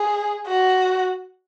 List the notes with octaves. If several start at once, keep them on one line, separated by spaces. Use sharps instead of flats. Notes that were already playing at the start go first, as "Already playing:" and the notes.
Already playing: G#4
F#4